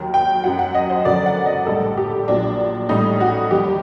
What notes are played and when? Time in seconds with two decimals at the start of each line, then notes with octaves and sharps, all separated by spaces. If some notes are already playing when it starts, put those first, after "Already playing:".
Already playing: D#2 D#3 F#3
0.14 G5
0.44 F#2 F#3 F#5
0.59 F#5
0.75 D#5
0.90 C5
1.05 F#1 F#2 D3 F#3 D5
1.26 F#5
1.46 D#5
1.66 A#1 A2 G3 A4
1.97 G4
2.28 A#1 A#2 F#3 D4
2.89 A1 A2 G3 D#4
3.20 F#4
3.51 D#2 D#3 G3 G4